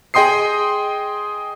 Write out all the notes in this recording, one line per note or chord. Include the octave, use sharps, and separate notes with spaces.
G#4 D#5 G5 C6 D#6 C7